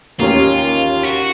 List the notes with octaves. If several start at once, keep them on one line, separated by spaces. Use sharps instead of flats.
D#2 D#3 A#3 C#4 F4
F#4